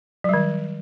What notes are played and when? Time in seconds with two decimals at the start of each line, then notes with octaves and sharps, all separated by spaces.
0.24 F#3
0.29 G3
0.34 D#3